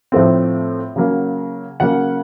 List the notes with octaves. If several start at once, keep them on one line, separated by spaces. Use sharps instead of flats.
A2 F3 A3 C4
C#3 F#3 A#3
C#3 F#3 A#3 F#5